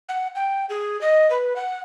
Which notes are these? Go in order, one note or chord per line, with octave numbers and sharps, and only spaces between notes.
F#5
G5
G#4
D#5
B4
F#5